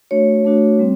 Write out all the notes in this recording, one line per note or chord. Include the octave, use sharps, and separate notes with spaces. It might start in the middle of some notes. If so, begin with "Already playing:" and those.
A3 D4 F#4 C#5
A3 D4 F#4
G3 C4